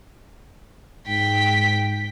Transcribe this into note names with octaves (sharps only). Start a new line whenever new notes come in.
G#2 G5 B6